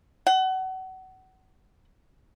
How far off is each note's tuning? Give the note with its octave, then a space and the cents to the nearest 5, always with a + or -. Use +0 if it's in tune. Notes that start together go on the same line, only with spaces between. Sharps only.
F#5 +30